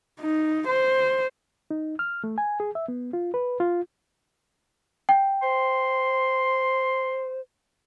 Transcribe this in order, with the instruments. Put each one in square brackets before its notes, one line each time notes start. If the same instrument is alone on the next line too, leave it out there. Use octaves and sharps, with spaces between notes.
[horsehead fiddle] D#4
C5
[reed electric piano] D#4
F6
A3
G#5
G#4
E5
B3
F4
B4
F4
[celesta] G5
[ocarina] C5 [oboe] C6